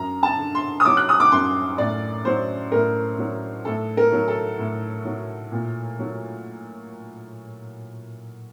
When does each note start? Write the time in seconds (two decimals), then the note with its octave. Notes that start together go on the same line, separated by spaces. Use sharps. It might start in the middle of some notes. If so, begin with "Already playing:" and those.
Already playing: F#2 A#5
0.23 A5
0.38 D3
0.55 C6
0.80 D#6
0.85 F#3 D6
0.97 F#6
1.09 D#6
1.20 D6
1.32 F#2 C6
1.78 A2 D5
2.25 F#3 C5
2.72 A2 A#4
3.18 F#3
3.65 A2 A4
3.97 A#4
4.12 F#3
4.28 A4
4.59 A2
5.05 F#3
5.52 A#2
5.99 F#3